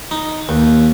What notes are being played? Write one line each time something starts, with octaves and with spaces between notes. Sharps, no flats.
D#4
D#2